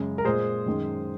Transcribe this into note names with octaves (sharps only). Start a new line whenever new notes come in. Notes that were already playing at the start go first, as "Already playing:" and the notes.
Already playing: F#2 C#3 G#3
A#4
A#2 G#3 G#4 C5
F#2 D#3 G#3